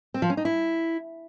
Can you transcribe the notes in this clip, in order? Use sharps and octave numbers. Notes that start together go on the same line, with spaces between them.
C4
F3
C#4
D#4
E4